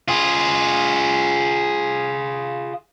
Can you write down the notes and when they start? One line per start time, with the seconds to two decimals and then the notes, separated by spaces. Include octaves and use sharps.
0.08 F4 G#4